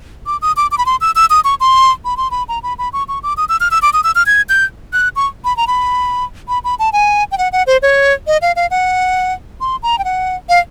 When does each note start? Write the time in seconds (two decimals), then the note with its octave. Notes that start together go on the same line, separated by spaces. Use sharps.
0.27 D6
0.42 D#6
0.57 D6
0.71 D6
0.78 B5
0.86 C6
1.01 E6
1.16 E6
1.30 D#6
1.44 C#6
1.60 C6
2.05 B5
2.17 C6
2.31 B5
2.49 A#5
2.63 B5
2.78 B5
2.93 C#6
3.08 C#6
3.23 D6
3.37 D#6
3.49 E6
3.60 F6
3.71 E6
3.82 D6
3.93 D#6
4.04 E6
4.15 F6
4.26 G#6
4.49 G6
4.93 F#6
5.16 C#6
5.45 B5
5.57 A#5
5.67 B5
6.48 B5
6.64 B5
6.79 A5
6.93 G#5
7.32 G5
7.38 F#5
7.53 F#5
7.67 C5
7.82 C#5
8.27 D#5
8.42 F5
8.56 F5
8.71 F#5
9.61 C6
9.83 A#5
9.99 G5
10.05 F#5
10.49 F5